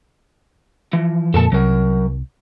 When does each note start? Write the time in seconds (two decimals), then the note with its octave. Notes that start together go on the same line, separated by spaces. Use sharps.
0.93 E3 F3
1.34 F2 A#2 A4 A#4 A5
1.52 C2 F#3 A#4